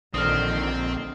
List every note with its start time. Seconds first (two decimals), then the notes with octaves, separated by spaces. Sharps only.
0.14 A#1 D3 D#3 C4 D#6 F6